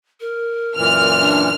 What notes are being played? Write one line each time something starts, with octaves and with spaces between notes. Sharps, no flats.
A#4
F#2 A#2 E3 F6
D4